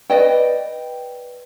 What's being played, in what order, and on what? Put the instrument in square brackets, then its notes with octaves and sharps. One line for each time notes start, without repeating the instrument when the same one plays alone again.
[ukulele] B4 D5 D#5 G5